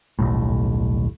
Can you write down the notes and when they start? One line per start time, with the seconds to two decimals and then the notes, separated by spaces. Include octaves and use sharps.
0.19 D#1 B1 A2